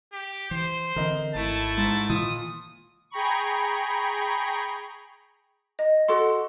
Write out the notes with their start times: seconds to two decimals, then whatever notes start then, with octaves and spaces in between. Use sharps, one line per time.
0.13 G4
0.51 E3 C5
0.96 D3 E3 C4 A#4 D#5
1.35 G#1 A3 E4 A5
1.78 G#2
2.10 A#2 D#3 E3 D#6
3.10 G#4 G5 A#5 B5 C#6
5.79 D#5
6.08 F#4 A4 F#5 C6